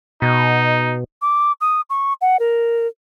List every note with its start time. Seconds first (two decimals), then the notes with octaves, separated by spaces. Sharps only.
0.22 B2 D#4
1.22 D6
1.61 D#6
1.90 C#6
2.21 F#5
2.39 A#4